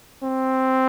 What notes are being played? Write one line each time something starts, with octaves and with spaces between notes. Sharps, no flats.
C4